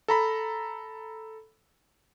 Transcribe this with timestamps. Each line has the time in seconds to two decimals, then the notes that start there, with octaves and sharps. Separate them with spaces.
0.08 A4 A#5 B5